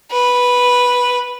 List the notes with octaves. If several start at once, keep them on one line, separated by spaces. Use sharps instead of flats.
B4